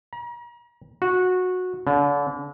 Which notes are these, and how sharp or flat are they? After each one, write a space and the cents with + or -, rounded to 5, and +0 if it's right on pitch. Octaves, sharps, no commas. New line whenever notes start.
A#5 +40
F#4 -15
D3 -40